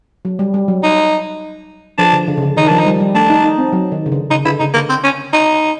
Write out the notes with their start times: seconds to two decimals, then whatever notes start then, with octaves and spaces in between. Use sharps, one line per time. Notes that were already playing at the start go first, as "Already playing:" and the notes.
0.25 F#3
0.39 G3
0.54 G3
0.68 F#3
0.83 D#4
1.98 F3 D4
2.13 D3
2.28 D3
2.37 C#3
2.42 D3
2.57 D#3 D#4
2.68 F3 D4
2.79 D#4
2.86 G3
3.00 G3
3.15 A3 D4
3.30 D#4
3.44 D#4
3.58 C4
3.72 F#3
3.92 D#3
4.06 C#3
4.12 D3
4.30 C#3 D#4
4.45 D3 E4
4.59 C#3 D#4
4.74 D3 A#3
4.89 C4
5.04 C#4
5.33 D#4